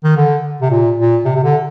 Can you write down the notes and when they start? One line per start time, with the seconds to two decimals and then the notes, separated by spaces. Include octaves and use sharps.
0.04 D#3
0.17 D3
0.62 C3
0.71 A#2
0.98 A#2
1.25 C3
1.35 C3
1.44 D3